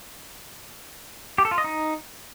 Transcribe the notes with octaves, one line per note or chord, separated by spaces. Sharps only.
G4
A4
F4
D#5
D#4